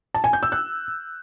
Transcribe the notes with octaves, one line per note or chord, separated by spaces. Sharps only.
A5
G#5
G6
E6
F#6